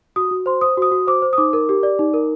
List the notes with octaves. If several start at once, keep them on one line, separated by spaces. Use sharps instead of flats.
F#4 D#6
F#4
C5 C6
C5 D#6
F#4 D#6
F#4
C5 D6
C5
D#6
D#4 D6
A#4
G4
D5
D#4
A#4